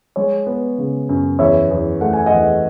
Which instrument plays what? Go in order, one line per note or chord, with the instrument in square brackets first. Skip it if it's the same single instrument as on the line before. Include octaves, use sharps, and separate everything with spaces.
[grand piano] G#3 C#5
B3
C#3
F#2
E2 C#5 E5
E2
A3 F#5
G#5
D#5 F#5
E2